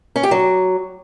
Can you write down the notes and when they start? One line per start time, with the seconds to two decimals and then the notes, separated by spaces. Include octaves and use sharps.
0.16 C#4
0.23 G4
0.31 F#3